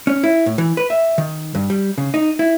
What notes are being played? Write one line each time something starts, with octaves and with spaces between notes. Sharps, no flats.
C#4
E4
A2
E3
B4
E5
D#3
G2
G3
C#3
D#4
E4